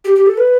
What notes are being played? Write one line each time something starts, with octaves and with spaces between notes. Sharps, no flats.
G4
G4
A4
B4